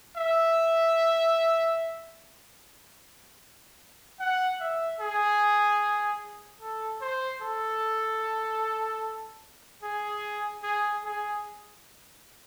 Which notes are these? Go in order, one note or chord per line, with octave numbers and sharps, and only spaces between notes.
E5
F#5
E5
G#4
A4
C5
A4
G#4
G#4
G#4